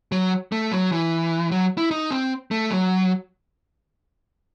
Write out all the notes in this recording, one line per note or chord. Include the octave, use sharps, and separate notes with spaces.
F#3
A3
F#3
E3
F#3
E4
D#4
C4
A3
F#3